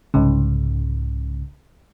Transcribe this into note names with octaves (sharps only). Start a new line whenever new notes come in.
C2 G#2 C#3